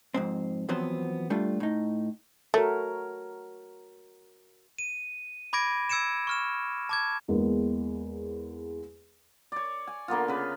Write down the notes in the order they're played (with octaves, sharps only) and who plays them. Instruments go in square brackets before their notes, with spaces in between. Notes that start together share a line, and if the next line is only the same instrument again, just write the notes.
[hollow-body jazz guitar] F2 G#2 C4
E2 F3 F#3 B3 C4 C5
G3 A3 D4 F4
A2 D#4
[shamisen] A3 [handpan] F#4 A#4 C#5
[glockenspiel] D#7
B5 D6 G#6 A#6 D7
E6 G#6 C#7 D7 E7
C#6 F6 E7
A5 D6 G#6
[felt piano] E2 G#3 A#3 B3
[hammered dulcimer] C#5 D5
G#5
D3 A#3 B3 F4
C#3 B4